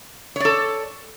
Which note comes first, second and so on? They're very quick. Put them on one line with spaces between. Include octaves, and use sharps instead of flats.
C#5 D5 A4